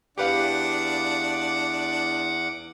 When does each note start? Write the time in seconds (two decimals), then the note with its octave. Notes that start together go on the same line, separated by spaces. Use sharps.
0.18 E2 D4 G4 B4 F5 F#5 D6